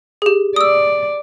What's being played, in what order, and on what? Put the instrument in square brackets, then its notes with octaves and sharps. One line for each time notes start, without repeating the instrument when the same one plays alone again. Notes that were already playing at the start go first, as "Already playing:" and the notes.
[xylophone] G4 G#4
[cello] D5 [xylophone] D#6 E6